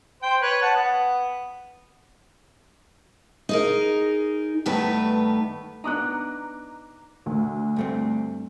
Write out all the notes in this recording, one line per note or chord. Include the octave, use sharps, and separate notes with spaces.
C5 G5
B4 C#5
F#5 A5
B3
D#4 G#4 A#4
G2 D#3 A3 B3 B4
B3 D4 D#4 A#5 D6 F#6
D2
G2 A3 C4